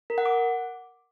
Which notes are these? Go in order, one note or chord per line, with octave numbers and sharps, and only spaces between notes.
A#4
F#5
D6